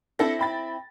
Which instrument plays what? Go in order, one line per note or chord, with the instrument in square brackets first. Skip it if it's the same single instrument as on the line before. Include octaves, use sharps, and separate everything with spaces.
[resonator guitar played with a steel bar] C4 E4 [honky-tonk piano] D4 A4 A#6
[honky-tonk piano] G5 B5 A6